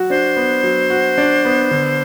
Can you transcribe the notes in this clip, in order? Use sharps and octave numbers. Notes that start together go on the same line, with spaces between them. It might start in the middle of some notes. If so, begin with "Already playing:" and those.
Already playing: F#3 F#4
D4 C5
B3
F#3
F#4
D4
B3
D3